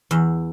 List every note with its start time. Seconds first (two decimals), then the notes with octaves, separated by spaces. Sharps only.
0.11 E2